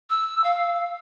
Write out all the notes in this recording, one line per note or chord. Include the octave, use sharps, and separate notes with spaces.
E6
F5